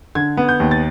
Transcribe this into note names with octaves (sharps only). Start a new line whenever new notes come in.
D3 G#6
B3
G6
D#2
A6